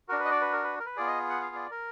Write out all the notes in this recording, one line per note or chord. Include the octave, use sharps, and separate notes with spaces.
D4 F#4 A#4
B4
D#5
D5
B4
A#4
B4
A#4
B4
B3 F4 G#4 D5
D#5
F#5
F5
D5
A#4